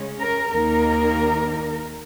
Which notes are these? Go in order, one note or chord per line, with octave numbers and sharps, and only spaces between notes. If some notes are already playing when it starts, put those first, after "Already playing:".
Already playing: C#3 G#3 C#4
A#4
D#2 D#3 A#3 D#4 A#4